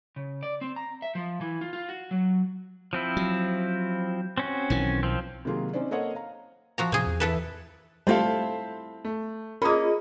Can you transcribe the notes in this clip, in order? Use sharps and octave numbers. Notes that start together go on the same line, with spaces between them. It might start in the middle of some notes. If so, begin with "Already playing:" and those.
C#3
D5
C4
A#5
E5
F3
E3
F4
F4
F#4
F#3
F3 C4 E4
F#3
C4 C#4 F#4
B1 D#3 E3
F3 C4
C3 D#3 F#3 A#3 F4 G#4
C4 C#4 D#4 C5 D5
A#3 A4 C5 C#5 D#5 F#5
F5 A#5
F3 F#4 A#5
A2 C3 C4 G#4
E2
E3 A4 B4
G3 A3 C4 E4 F4 A4 C5 F5
A3
A#3 C#4 F4 G#4 A#4 D#5 B5 D#6